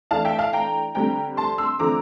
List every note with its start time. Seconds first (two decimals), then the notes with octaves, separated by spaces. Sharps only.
0.11 E3 A3 D4 F5 A5
0.25 E5 G5
0.38 F5 A5
0.53 G5 A#5
0.95 D3 G3 C4 G5 A#5
1.37 A5 C6
1.58 C6 E6
1.79 D3 F3 A3 C4 A#5 D6